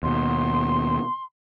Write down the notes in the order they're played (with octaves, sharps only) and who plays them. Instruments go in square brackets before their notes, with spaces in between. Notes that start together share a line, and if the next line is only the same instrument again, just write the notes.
[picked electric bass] D#2 B2 [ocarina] C6